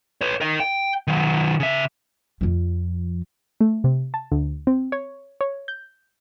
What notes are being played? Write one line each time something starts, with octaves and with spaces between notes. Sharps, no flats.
B4 C#5
A#4 D#5
G5
D#3 F#3
C#3 E5
F2 F3
A3
C3
A5
D2
C4
C#5
C#5
G6